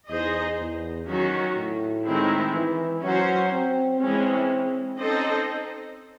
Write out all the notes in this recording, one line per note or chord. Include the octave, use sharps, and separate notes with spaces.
E2 D#4 G#4 C5 D#5
E2
D#3 F#3 C#4 F#4
A2
D#3 G#3 C4 E4
E3
F#3 C#4 F#4 C5
C4
E3 G#3 C4 C#4
C4 C#4 D#4 A4 C5 D#5